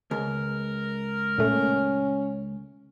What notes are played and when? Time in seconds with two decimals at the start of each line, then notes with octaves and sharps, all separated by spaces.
0.11 C#2 A#4
1.38 A#2 A3 C#4